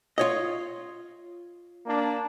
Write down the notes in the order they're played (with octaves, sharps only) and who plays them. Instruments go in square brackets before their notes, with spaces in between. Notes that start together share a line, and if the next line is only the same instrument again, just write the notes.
[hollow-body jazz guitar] F4 C#5 D#5
[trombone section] A#3 D4